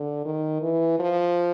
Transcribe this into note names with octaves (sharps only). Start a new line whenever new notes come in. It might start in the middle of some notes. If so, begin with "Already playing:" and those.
Already playing: D3
D#3
E3
F3